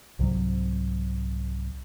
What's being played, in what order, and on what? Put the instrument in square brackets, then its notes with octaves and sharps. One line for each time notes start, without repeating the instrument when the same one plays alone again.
[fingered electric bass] C2 G#2 C3 F#3